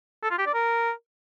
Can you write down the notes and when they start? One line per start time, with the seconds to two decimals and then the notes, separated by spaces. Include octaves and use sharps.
0.23 A4
0.30 F4
0.38 G4
0.46 D5
0.54 A#4